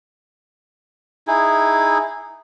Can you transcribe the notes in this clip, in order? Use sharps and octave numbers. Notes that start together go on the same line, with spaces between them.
D#4 E4 G#4